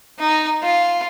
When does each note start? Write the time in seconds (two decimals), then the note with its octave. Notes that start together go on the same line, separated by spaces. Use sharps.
0.19 D#4
0.62 F4